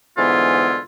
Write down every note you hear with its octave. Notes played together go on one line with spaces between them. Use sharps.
G#2 D3 E3 B3 E4 F4